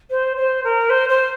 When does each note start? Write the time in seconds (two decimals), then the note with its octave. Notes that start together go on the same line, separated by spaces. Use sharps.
0.10 C5
0.36 C5
0.64 A#4
0.89 C5
1.09 C5